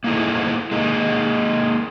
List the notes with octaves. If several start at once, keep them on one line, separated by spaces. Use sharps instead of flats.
A#3 B3 D#4 E4 G#4 A4
G#3 A#3 D#4